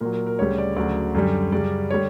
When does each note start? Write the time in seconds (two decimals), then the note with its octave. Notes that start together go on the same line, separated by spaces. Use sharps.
0.01 A#2 F#3 A#4
0.13 A#4
0.26 A#4
0.39 D2 C#3 G3 C#5
0.58 D5
0.76 D2 C#3 F#3 D5
1.15 F#2 D3 G3
1.52 F#2 C#3 G3 D5
1.91 D3 G3 C#5